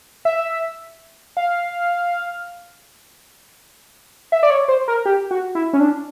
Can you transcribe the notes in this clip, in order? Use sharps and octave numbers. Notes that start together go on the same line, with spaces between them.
E5
F5
E5
D5
C#5
C5
A#4
G4
F#4
E4
C#4
D4